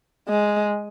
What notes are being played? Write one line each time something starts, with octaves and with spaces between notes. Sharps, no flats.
G#3